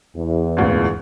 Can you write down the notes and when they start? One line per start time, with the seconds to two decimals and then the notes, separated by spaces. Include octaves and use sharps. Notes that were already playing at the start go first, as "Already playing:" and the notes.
0.16 E2
0.57 G#1 D2 A#2